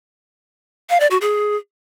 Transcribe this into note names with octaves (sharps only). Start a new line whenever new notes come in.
F5
D5
F#4
G#4